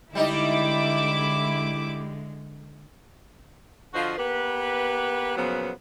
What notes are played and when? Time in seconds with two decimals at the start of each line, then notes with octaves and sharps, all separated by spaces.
0.15 D3 G3 G#3 D#4 E4 D#5 D6
3.94 D3 F3 F4 F#4 C5 D#5
4.18 A#3 B3 G4 B4
5.37 A#2 C#3 F3 F#3 B3